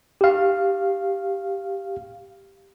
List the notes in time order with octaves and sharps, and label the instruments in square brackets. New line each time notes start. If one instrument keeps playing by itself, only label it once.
[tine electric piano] G4 F5